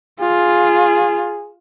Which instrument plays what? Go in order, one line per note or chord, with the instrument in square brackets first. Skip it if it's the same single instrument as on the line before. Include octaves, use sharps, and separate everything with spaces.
[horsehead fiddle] F4 [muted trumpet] G#4